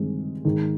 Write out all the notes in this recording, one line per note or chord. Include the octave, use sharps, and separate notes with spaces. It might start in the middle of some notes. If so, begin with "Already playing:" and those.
Already playing: G2 D#3 G#3 C4
G#2 D#3 G#3 D#4